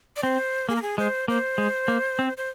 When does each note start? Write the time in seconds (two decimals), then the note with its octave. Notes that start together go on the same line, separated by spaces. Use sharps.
0.16 D5
0.23 C4 C5
0.69 A#3 G#4
0.75 A#4
0.82 G#4
0.98 G#3 C5
1.28 A#3 C5
1.58 G#3
1.88 A#3
2.19 C4
2.37 C5